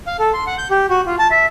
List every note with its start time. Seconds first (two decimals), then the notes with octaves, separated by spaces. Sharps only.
0.07 F5
0.19 A4
0.33 C6
0.47 F#5
0.58 G6
0.70 G4
0.90 F#4
1.06 F4
1.19 A5
1.31 E5